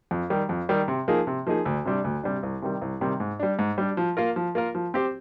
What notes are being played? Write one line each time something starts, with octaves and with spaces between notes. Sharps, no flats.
F2
D#3 G3
F2
D#3 G3
C3
F3 A#3 D#4 G#4
C3
F3 A#3 D#4 G#4
D2
C3 G3 D4
D2
C3 G3 D4
C2
C3 D#3 G3
C2
C3 D#3 G3
G#2
G3 D4
G#2
G3 D4
F3
A#3 F4 A#4
F3
A#3 F4 A#4
F3
C4 G4 C5